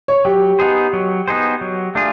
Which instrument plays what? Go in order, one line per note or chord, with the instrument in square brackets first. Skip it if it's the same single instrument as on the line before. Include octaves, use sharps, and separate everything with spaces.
[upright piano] C#5
[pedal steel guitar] F#3 [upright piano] G4
[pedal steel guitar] B3 D#4 G#4 C5
F#3
B3 D#4 G#4 C5
F#3
A3 D4 F4 G#4